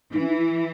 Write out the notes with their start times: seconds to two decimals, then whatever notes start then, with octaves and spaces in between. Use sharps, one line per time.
0.13 E3 D#4
0.21 C#4
0.28 D#4
0.39 E4